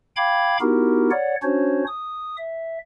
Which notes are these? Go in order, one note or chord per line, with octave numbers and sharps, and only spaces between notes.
F5 G5 B5 D6 G#6
B3 D#4 E4 F#4 G4 A#4
C#5 D5 F#5
C#4 D4 F#4 C5 C#5
D#6
E5